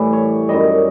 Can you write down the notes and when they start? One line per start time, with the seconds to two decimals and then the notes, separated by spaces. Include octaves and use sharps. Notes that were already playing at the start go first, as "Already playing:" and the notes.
Already playing: A2 E3 G3 E5
0.13 C#5
0.49 F#2 D#3 G3 D#5